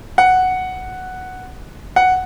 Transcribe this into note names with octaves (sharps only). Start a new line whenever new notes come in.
F#5
F#5